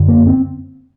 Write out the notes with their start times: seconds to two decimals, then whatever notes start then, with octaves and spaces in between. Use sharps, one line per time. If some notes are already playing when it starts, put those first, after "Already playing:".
Already playing: F#2 D3
0.08 A#3
0.27 C4